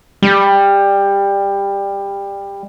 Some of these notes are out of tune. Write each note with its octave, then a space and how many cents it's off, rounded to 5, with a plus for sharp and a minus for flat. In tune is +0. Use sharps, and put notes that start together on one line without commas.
G3 +20